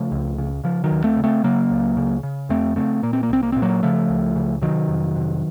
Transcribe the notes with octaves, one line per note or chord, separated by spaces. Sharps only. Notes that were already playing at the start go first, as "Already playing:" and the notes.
Already playing: C#3 F3 A3
C#2
C#3
C#3 F3
D#3 F#3
D#2
A3 C4
C#3
A3 C4
C#3 F#3 A#3
C#2
C#3
C#3
F2 A3 C4
C#3 A3 C4
A#2 A#3
C4
A#3
C2 C4
A#3
A#2 C4
F#3 A#3
C#3 F3 A3
C#2
C#3
C3 D#3 F#3
F2
C3